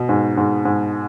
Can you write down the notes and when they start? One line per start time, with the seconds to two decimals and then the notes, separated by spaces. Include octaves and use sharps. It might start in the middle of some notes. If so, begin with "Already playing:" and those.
Already playing: B2
0.09 G#2
0.37 G#2
0.65 G#2